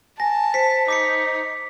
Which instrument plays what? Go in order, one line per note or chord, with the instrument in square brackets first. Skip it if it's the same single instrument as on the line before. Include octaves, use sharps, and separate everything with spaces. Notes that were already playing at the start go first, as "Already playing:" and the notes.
[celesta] G#5 [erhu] A5 [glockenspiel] A#6
[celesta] C5 [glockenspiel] B6 C#7
[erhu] D#4 [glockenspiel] D6 B6 C#7